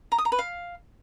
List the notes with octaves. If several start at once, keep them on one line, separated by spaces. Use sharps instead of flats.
A#5
D#6
A#5
B4
F5